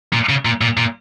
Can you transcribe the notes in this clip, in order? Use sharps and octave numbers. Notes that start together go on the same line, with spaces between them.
A#2
C#3
A#2
A#2
A#2